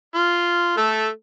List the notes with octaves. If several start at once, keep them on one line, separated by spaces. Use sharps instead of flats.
F4
A3 A4